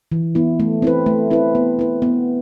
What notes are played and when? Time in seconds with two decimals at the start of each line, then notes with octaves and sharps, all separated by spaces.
0.12 E3
0.35 B3 E4
0.60 A3
0.82 C4 E4 B4
1.06 A3
1.30 C4 E4 B4
1.55 B3
1.79 E4 B4
2.02 B3